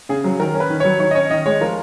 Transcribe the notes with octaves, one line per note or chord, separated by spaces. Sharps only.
C#3 G#4
F#3
D#3 A#4
C#4
B4
D#3
F#3 C#5
D#3 C#5
D#5
C#4 C#5
D#3 D#5
G#3 C#5
F3 A#4